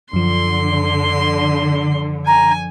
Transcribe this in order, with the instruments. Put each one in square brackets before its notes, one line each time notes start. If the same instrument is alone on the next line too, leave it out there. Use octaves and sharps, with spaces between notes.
[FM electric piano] F#2 F3 [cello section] D3 [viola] C6
[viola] G#5 [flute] A#5